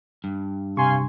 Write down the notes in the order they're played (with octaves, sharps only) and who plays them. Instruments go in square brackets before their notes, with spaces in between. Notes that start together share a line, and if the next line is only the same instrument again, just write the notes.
[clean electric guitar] G2
[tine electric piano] C3 C#6 [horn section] F5 G#5 C6